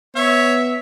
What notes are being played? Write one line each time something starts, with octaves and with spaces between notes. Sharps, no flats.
B3 C#5 E5